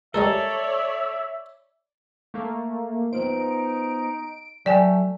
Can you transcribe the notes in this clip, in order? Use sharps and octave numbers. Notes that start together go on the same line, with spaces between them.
G3 G#3 A4 A#4 C#5 D5 E5
A3 A#3
B3 D#4 F4 C5 D7
F#3 A3 D5 G5 G#5